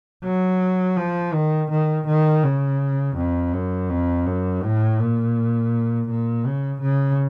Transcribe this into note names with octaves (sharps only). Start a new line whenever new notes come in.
F#3
F3
D#3
D#3
D#3
C#3
F2
F#2
F2
F#2
A2
A#2
A#2
C#3
C#3